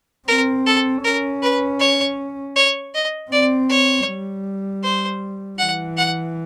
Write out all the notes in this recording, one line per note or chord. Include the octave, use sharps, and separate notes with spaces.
C4 A#4
A4
C#4 A#4
B4
C#5
C#5
D#5
C4 D5
C#5
G3
C5
E3 F#5
F#5